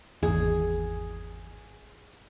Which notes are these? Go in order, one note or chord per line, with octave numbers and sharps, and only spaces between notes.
G#1 E2 G#4